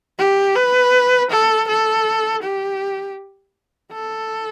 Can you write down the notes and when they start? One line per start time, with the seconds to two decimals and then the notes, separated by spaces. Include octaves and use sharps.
0.19 G4
0.56 B4
1.31 A4
1.68 A4
2.43 G4
3.93 A4